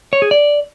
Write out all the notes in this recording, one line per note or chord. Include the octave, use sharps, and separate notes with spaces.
C#5
G#4
D5